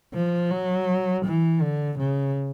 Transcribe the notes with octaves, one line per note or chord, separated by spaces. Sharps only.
F3
F#3
E3
D3
C#3